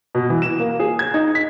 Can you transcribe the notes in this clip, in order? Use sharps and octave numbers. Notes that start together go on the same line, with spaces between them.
B2
E3
E7
A#3
G#4
G#6
D#4
B6